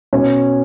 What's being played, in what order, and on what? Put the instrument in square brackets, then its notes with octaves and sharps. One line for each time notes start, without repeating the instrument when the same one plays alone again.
[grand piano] B2 C#4